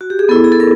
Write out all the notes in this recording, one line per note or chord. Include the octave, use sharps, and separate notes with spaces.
F#4
G4
G#4
B3 E4 A4
G#4
A4
A#4